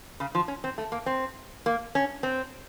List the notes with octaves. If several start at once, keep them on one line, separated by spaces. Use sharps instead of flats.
C#3
F3
C#4
C4
A3
A#3
C4
A#3
C#4
C4